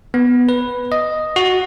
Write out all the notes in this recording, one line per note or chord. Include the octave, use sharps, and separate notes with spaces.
B3
B4
D#5
F#4